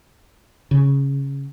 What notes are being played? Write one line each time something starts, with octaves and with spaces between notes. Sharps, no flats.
C#3